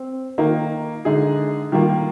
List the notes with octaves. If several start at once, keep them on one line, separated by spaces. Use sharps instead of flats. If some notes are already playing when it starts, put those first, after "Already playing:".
Already playing: C4
D#3 A#3 D#4
D3 G#3 D#4 G#4
D#3 G3 A#3 F4